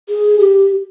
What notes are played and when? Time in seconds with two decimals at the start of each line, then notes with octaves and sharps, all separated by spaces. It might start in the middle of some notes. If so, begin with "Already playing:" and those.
0.09 G#4
0.39 G4